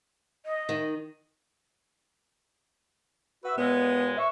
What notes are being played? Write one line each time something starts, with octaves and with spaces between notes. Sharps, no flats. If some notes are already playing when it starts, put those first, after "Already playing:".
D#5
D#3
F#4 B4 E5
D#2 A#2 G#3 B3
E5 C#6